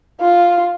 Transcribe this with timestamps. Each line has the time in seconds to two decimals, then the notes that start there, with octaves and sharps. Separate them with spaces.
0.20 F4